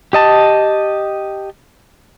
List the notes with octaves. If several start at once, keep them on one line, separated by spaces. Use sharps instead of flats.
G4 D#5 A5